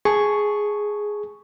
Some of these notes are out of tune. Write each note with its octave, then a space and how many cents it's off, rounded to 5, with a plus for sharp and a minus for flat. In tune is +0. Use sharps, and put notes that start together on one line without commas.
G#4 +0 A5 -15 C#6 +0